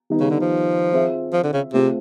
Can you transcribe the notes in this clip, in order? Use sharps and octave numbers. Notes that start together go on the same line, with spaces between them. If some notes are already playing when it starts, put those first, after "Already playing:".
D#3 G3 B3 D#4
C#3
D3
F3
C4 F4 G#4 C5 E5
F3
D3
C#3
C3 A3 C4 F4 G#4